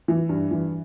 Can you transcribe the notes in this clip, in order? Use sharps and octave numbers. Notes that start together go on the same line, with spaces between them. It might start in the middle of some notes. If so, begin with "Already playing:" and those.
E3
G2
E3